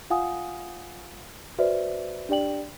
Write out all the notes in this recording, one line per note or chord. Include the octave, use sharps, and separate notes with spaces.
F4 F5 F#5 G#5 D#6
F#4 B4 C5 D5 E5
D4 G4 D5 G5 F#7